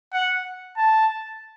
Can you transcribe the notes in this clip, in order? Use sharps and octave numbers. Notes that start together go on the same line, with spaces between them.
F#5
A5